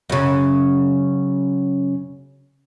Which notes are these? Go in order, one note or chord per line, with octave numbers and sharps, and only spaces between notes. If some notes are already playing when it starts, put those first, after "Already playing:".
F#2 C#3